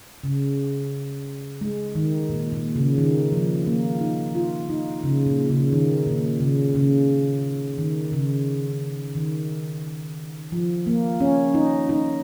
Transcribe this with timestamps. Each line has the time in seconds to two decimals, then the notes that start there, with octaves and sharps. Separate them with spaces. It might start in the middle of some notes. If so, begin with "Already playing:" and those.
0.24 C#3
1.61 G#3
1.95 D#3
2.29 A#2
2.52 A#2
2.76 C#3
2.98 D#3
3.32 F3
3.67 A#3
4.01 D#4
4.35 F4
4.70 D#4
5.03 C#3
5.26 A#2
5.50 C#3
5.72 D#3
6.07 A#2
6.40 C#3
6.75 C#3
7.78 D#3
8.12 C#3
9.15 D#3
10.52 F3
10.87 A#3
11.20 C#4
11.54 D#4
11.89 D#4